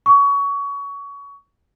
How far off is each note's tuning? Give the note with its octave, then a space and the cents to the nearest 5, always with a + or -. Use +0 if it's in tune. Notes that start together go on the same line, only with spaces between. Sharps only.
C#6 +25